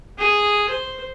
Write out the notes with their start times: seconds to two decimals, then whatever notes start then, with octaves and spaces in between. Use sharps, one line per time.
0.18 G#4
0.69 C5